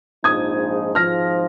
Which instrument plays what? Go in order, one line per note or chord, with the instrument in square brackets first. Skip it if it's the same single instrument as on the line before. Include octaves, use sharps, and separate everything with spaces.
[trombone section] A#1 G#2 F3 G#3 D#4 [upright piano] D#6 G#6
[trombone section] G#1 G#2 F3 [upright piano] F6 A#6